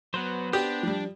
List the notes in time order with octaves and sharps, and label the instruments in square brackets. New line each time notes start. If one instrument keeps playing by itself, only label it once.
[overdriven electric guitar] F#3 [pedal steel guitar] B3 B4 C5
[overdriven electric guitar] D4 [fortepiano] G4
[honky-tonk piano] F3 G3